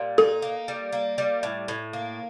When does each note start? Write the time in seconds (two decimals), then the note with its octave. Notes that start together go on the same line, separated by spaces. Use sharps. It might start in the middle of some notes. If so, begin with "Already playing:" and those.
Already playing: A#2 G3
0.18 D#4 A4
0.42 A#3
0.68 G3
0.93 A#3
1.18 G3
1.43 A2
1.68 A2
1.93 A#3